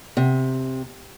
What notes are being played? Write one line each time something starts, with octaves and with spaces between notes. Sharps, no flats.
C3